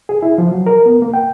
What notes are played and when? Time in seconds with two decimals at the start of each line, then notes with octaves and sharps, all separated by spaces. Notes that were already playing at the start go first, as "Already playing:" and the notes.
0.09 G#4
0.22 E4
0.38 F3
0.52 F#3
0.67 A#4
0.86 B3
1.02 A#3
1.14 G5